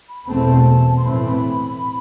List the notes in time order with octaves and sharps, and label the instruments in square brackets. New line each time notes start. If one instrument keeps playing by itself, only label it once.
[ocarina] B5
[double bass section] E2 B2 A3 C4 [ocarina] A5
[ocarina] C6
[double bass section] A2 E3 A3 C4 [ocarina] B5